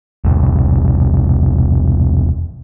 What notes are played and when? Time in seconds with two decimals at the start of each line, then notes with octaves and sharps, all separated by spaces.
0.25 E1 C2